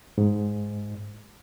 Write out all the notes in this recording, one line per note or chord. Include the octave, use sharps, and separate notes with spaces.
G#2